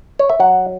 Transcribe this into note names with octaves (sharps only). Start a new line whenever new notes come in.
C#5
E5
F#3 F#5